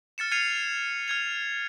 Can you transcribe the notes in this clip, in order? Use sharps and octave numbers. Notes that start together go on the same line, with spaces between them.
F6 A6 C#7 E7
F6 G#6 C7 C#7 D#7 F7
F6 G#6 F7